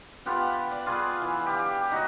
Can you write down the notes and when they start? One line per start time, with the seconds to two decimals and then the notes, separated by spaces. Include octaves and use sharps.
0.26 B3 F4 G4 F#5
0.71 D5
0.86 F4 G#4 B4
1.22 E3
1.46 G4 F5
1.92 D#4 F#4 C#5 D#5